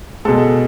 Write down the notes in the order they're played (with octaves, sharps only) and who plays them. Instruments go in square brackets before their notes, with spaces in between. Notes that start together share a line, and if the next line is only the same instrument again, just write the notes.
[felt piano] B2 G#3 A4